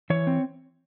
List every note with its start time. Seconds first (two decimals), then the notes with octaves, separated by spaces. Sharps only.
0.10 E3 C#5
0.27 C4